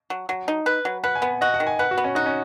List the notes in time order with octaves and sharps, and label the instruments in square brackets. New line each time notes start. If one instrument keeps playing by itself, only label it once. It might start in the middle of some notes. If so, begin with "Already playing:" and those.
[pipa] F#3
F#3
D#4
B4
F#3
[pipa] B4 [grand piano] F#5
[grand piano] G#5
[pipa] B3 [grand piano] F#5
[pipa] F#4 [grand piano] D#5
[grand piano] F#5
[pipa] D#3
[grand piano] G#5
[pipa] B4 [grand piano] F#5
[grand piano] F#4
[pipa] B3
[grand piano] C#4
[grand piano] D#4 [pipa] F#4
[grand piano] C#4